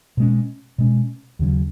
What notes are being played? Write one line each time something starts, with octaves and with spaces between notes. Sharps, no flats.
B2 G#3 C#4
B2 G#3 C#4
D#2 C#3 F#3